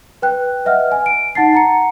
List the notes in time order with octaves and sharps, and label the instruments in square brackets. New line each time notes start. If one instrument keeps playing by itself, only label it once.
[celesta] B4 G5 F#6
B4 D#5 E5 F#5 F6
G#5
D7
D#4 F#5 A5 A6 C7
F#5 A#5 C#7